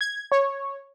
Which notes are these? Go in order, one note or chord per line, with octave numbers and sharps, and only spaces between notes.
G#6
C#5